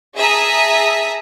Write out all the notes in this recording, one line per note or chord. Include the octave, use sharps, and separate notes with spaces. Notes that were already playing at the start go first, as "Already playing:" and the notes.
G#4 E5 A5 A#5 D#6 B6